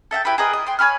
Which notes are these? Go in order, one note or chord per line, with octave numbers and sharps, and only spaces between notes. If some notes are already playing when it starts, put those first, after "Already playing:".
A4 E5 F#5 G5
E4 G4 B4 B5
G#4 A#4 B4 D#5
D#5
G5 C6
C#5 G#5 B5 F6